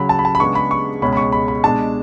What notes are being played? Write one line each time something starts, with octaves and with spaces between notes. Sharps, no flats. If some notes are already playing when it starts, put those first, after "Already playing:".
Already playing: C#3 F#3 C#4 B5
A5
B5
A5
B5
C#3 G#3 B3 D4 C#6
B5
C#6
C#2 B2 G#3 C#4 B5
B5
C#6
B5
B5
B2 G#3 D4 A5